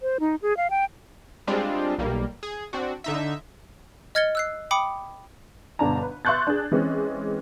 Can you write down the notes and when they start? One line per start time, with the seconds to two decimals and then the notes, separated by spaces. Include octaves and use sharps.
0.01 C5
0.20 D#4
0.42 G#4
0.57 F5
0.70 G5
1.47 G3 G#3 C4 D4 F4
1.98 B1 G3 A#3
2.43 G#4
2.73 C4 D4 F#4
3.04 D3 D#4 E5
4.15 D#5 F6 G#6 A6 C#7 G7
4.35 E6 F#6 C7
4.71 G5 B5 D6 D#6 C#7
5.79 G1 B2 D3 D5 A5 A#5
6.02 B4
6.25 E5 C6 C#6 F#6 G6 A6
6.47 D4 G#4
6.72 E3 G#3 C4 C#4